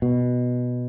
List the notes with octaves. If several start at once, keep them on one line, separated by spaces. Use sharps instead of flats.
B2